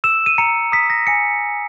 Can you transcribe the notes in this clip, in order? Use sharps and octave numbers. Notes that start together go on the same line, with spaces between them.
E6 E7
D#7
A#5 C#7
D#6 B6
A#6
G#5 C#7